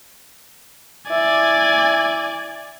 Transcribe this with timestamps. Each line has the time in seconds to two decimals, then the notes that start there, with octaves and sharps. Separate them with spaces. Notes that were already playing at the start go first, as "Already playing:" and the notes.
1.10 E4 D5 G#5